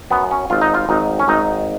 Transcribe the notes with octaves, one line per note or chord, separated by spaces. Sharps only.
F#2 B3
C#4
G#1 F4
D#4
F4
G#1 D#4
C#4
G#1 D#4